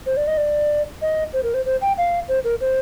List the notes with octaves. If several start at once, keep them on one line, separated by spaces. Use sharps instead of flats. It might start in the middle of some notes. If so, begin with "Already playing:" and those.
C5
D5
D#5
D5
D#5
C5
A#4
C5
C5
G5
F5
C5
A#4
C5